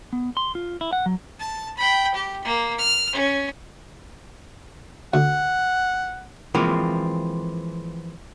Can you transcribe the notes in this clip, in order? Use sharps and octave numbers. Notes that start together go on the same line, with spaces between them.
B3
C6
F4
E4
F#5
F#3
A5
G5 B5
G4
A#3
F6
C#4
D2 F#5
E3 F3 G#3 A#3 C4 F4